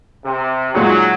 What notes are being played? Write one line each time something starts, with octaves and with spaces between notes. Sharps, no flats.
C3
A#2 F#3 G#3 D#4